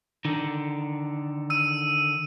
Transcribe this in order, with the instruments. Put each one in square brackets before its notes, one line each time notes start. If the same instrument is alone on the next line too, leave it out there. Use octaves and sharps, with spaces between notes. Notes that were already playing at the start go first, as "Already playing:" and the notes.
[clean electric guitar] D3 D#3
[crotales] E6 D#7